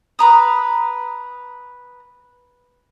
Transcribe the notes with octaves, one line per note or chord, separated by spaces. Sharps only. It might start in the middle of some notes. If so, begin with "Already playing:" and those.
B4 A#5 D#6